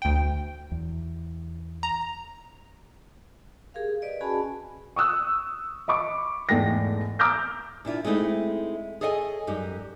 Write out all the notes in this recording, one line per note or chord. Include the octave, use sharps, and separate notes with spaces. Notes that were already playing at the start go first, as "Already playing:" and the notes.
D2 G5
E2
A#5
G4 G#4 A#4 F5
B4 D5 D#5
C#4 F#4 G#4 G#5 A5 B5
C#6 D#6 E6 F#6
D#5 B5 C#6 D6
E2 G#2 A3 B3 G5 A#6
A#5 D6 E6 F6 G6 A#6
A#2 D4 E4 F4
G#3 A3 C4 D#4 E4
G#4 A4 C#5 D#5 G5 G#5
F#2 G3 D#4